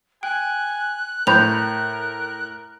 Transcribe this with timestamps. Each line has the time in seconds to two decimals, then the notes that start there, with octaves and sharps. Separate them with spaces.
0.23 G5 G#5 F#6
1.27 A2 A#4 C5 B5 G6 F7